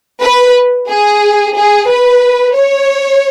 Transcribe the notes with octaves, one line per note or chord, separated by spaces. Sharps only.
B4
G#4
G#4
B4
C#5